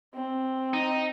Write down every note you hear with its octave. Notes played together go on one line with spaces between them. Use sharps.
C4
D#4